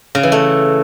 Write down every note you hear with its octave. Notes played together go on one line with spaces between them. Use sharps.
C#3
E3
A3